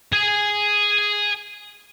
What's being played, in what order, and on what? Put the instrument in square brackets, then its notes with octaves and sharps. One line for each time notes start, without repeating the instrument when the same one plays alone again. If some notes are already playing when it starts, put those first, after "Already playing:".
[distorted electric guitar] G#4 G#5